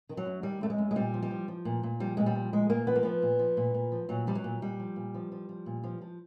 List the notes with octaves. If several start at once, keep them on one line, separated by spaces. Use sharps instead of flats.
D#3
F#3
F#2
D#3 G3
F#2 A3
G#3
F#2
G#3
A#2 G3
F3
G3
F3
F3
A#2
A#2
F3 G3
A#2 G#3
G3
F3
A#2 G#3
A#2 A#3
F3 B3
A#3
F3 B3
A#2
F3
A#2
A#2
F3
A#2 F#3
F3 G3
F#3
A#2
A#2 G3
F3
A#2
F3
F3
F3
A#2
F3
F3